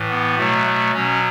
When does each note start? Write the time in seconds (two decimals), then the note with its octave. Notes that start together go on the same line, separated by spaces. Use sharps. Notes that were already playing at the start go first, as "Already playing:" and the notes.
Already playing: A2 E3
0.10 B3
0.38 B2 F#3 A3
0.66 A3
0.94 B2 F#3 C#4